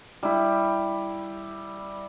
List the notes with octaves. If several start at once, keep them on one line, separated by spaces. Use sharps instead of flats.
G3 E4